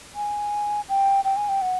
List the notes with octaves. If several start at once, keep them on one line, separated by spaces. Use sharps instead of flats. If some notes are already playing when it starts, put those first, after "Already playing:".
G#5
G5
G5
G#5
G5
F#5